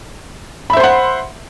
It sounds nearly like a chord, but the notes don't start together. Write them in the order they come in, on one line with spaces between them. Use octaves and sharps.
B5 E5 C5 C6 F#5